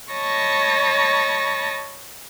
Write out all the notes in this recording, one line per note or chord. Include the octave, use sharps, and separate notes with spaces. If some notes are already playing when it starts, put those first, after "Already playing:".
C#5 D#5 A5 B5 C#6 A#6